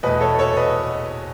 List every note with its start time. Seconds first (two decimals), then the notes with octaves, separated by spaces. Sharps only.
0.03 E2 B2 A3 B4 D#5
0.21 A4 C#5
0.39 A4 C#5
0.57 B4 D#5